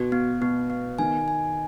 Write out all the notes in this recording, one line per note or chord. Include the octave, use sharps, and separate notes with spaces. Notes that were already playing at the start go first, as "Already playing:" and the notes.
Already playing: B2 F#4
B3
B2 B3
B3
D#3 G#5
G#5